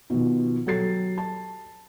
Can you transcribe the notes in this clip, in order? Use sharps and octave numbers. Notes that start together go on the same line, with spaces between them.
B2 D#3 F3
F#3 G4 A4 A6 C7
A5